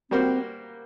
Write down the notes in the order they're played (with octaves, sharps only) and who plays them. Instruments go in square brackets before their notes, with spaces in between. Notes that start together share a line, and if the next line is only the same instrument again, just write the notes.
[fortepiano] G3 A#3 F#4 C5 [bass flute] C4